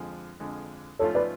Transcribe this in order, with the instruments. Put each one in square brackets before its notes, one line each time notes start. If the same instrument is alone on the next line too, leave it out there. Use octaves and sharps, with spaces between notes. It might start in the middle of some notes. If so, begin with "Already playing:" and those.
Already playing: [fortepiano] F2 D3 F3 G#3
F2 D3 F3 G#3
[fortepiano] G#2 F3 A3 C#4 F4 [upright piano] A4 C#5
[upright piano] B4 D5